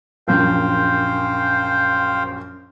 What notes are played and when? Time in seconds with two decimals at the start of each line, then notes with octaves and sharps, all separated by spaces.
0.28 A#1 F#2 C5 F5 G5